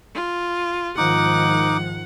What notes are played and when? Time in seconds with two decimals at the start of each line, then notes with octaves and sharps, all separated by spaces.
0.14 F4
0.98 G#2 D#3 F3 D#4 F#5 D6